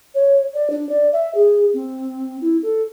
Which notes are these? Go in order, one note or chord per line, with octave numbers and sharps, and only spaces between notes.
C#5
D5
D4
D5
E5
G#4
C4
E4
A4